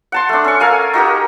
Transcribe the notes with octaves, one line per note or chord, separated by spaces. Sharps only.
F#5 A5 C6
A3 D4
C#4 C#6
A4 A#4 F5 G#5
D#4 F#4 G4 A#4